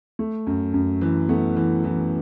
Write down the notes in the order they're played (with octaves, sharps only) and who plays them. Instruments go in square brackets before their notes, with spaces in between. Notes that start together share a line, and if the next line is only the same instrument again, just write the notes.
[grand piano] A3
F#2
F#2
E3
A3 B3
E3
E3